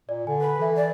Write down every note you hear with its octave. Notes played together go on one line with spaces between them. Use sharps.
A#2 D5
D3 G#5
B4
E3 A4 E5
D5